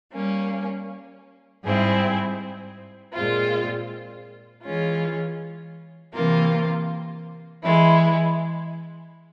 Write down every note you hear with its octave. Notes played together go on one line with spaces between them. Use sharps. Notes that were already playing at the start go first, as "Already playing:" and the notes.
G3 A#3 C#4
G#2 G3 C4 E4 G#4
A#2 G#3 C4 F4
E3 G#3 C#4 F4
C3 E3 A#3 F4 A#4
E3 G#3 E4